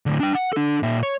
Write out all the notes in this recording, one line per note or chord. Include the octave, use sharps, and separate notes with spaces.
A2 D3
D4 G5
F#5
D4 A4
A#2 E5
C#5